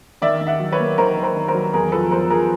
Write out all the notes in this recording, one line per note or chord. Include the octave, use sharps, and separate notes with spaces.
D#3 D5 E5
D#3
E5 F#5
F#3
B4 C#5
A#3
D#3 A#4 C5
D#3
A#4 C5
D#3
A#4 C5
F#3
E2 G#4 A#4
F3 A4 B4
E2 A#4 C5
F3 G#4 A#4